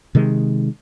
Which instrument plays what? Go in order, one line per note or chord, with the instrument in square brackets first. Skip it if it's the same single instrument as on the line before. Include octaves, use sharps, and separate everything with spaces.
[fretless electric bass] C3 D#3 G#3